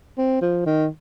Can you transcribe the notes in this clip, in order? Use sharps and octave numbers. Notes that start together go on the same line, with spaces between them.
C4
F3
D#3